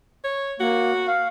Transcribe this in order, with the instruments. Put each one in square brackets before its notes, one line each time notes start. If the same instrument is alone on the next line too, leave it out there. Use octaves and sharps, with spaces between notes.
[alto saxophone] C#5
[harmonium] A#3 [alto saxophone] F#4
[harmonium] F5